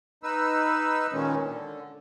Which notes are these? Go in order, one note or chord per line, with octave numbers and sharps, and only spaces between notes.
D#4 B4 E6
A#2 D#3 G#3 C#4
D3